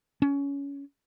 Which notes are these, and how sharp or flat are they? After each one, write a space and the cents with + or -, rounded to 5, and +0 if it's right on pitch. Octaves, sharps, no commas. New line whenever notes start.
C#4 +20